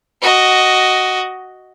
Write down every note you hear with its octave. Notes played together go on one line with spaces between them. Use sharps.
F#4 D#5